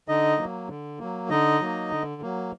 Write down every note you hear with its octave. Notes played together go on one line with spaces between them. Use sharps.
D3 D#4 D#5
F#3 A#3
D3
F#3 A#3
D3 D#4 D#5
F#3 A#3
D3
F#3 A#3